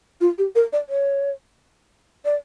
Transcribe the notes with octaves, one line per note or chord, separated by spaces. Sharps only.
F4
G4
A#4
D5
C#5
D5